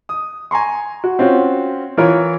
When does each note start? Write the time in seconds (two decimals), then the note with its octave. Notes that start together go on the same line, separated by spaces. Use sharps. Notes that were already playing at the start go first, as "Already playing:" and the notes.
0.09 D#6
0.51 G#5 A#5 C6 C#6
1.04 F#4
1.19 C4 C#4 F4 F#4
1.98 E3 F4 A#4 C#5